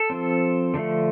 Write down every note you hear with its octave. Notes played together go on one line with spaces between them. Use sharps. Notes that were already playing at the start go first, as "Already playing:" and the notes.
Already playing: A4
F3 C4
D3 F3 A3